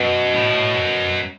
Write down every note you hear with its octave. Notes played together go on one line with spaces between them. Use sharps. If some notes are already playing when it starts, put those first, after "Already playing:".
Already playing: F#2 B2
A2
F#2